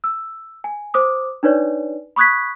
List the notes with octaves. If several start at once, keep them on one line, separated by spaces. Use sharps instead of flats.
E6
G#5
C5 D6 D#6
D4 D#4 B4 C#5 D5
B5 C#6 D#6 F#6 G#6 B6